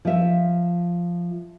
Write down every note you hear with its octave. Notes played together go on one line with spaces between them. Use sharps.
F3 E5